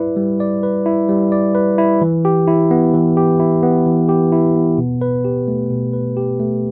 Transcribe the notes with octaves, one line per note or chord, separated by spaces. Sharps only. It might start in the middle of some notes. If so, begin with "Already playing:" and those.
Already playing: G3 E4 B4 D5
G3
D5
B4
E4
G3
D5
B4
E4
E3
G4
E4
B3
E3
G4
E4
B3
E3
G4
E4
B3
B2
B4
G4
A3
B2
B4
G4
A3